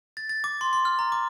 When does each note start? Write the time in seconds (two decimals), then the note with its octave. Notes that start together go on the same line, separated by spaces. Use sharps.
0.17 A6
0.29 A6
0.44 D6
0.61 C6
0.73 C6
0.85 F6
0.99 A#5
1.12 D6